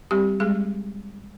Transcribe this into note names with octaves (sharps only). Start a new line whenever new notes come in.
G3 C4 G4
G3 G#3 G#4